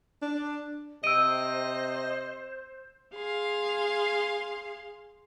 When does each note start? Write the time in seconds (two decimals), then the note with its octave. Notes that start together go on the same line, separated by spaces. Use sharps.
0.22 D4
1.04 C3 C5 D#5 E6 D7 D#7
3.14 G#4 F5 C6